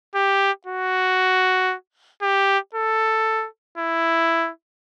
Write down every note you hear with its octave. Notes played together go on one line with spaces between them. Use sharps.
G4
F#4
G4
A4
E4